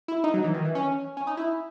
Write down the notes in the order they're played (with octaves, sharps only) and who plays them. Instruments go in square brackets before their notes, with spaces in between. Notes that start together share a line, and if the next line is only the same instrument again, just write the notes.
[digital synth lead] E4
D#4
F#3
E3
D#3
E3
C#4
C#4
D#4
E4